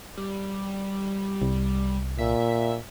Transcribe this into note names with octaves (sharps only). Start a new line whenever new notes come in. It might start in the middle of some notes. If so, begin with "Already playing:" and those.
G3
C2
A#2 E5